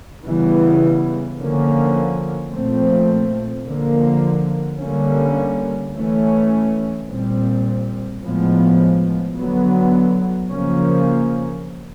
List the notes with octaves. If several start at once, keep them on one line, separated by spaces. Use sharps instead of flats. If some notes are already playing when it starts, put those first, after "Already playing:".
C#3 E3 G3 B3
D3 F3 A#3 C#4
A#2 F3 A3 C4
D3 F3 A#3
D3 G3 A#3 C#4
E3 A3 C#4
A#2 G3 C4
A2 F3 G#3 B3
D3 F#3 B3
C#3 F3 A#3 C#4